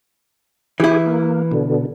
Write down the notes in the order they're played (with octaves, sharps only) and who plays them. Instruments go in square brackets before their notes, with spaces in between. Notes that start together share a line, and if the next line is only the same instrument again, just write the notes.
[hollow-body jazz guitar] E3 E4 [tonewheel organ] G4 G#4
[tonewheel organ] A#3
B2 D3